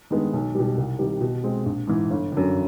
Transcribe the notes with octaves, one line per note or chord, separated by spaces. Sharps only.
G2 D#3 G#3 B3
B1
B2 G3
C2
C3 D#3 G3
B2
G#3 C4
A#1
G#2 E3
G1
F#2 D3